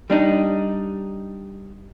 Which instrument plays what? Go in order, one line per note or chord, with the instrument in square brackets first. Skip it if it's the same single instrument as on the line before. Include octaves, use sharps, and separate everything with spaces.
[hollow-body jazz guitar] G3 D4 D#4